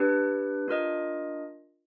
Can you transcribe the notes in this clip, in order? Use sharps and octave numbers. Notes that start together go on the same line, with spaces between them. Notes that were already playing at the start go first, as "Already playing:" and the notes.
Already playing: D4 G4 B4
D4 F4 A#4 D#5